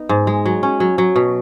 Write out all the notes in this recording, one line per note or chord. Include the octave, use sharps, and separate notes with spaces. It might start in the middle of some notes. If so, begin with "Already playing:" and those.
Already playing: B3 D#4
G#2
G#3
F#3
C#4
F#3
F#3
B2